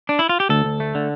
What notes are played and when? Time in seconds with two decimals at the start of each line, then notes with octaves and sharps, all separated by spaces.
0.09 D4
0.19 E4
0.29 F4
0.40 G4
0.49 D2 A4
0.65 D2
0.80 A3
0.95 D3